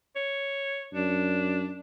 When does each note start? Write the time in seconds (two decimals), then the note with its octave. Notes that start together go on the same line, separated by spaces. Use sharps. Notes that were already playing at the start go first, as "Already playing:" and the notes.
0.16 C#5
0.94 F#2 D4